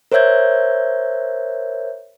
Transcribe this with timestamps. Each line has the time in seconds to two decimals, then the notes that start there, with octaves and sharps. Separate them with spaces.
0.12 A#4 C5 C#5 E5 G6 G#6